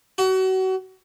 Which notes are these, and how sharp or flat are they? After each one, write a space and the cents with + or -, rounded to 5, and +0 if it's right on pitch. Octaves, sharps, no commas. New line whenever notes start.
F#4 +30